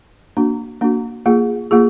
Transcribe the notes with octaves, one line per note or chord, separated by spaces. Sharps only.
A#3 D4 F#4
A#3 D4 F#4
A#3 F4 G#4
A#3 F4 G#4